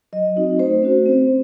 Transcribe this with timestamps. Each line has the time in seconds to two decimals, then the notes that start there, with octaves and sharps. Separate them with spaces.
0.13 F#3 D#5
0.36 C4 D#4 F#4
0.59 A3 C5
0.82 C#4 F#4
1.06 C4